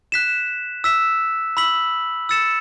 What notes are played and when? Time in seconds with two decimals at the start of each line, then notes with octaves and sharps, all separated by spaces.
0.12 F#6 B6 E7
0.84 E6 B6 E7
1.57 B5 E6 B6 F#7
2.29 E6 A6 C#7 E7